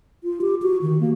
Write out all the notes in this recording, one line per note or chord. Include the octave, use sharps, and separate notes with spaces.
F4
G4
F#4
D#3
A#3